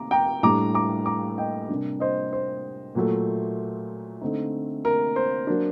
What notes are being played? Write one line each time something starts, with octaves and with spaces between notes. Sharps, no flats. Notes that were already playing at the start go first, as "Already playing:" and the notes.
Already playing: D#3 A3 C4 A#5 D6
G5 A#5
A2 G3 D4 A#5 D6
A#5 D6
A#5 D6
D#5 G5
C3 G3 A#3 D4
C5 D#5
C5
A#2 F#3 A3
D3 A3 C4 D#4
A#4
C5
F#3 A#3 D4